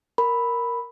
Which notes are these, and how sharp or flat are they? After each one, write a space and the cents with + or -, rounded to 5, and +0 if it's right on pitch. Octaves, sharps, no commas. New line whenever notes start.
A#4 +0 B5 +0